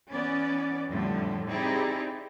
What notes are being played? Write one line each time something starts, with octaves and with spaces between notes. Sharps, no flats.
E3 B3 C#4 D5
F2 A2 D3 F3 G3 A3
C4 D#4 E4 G4 G#4 D5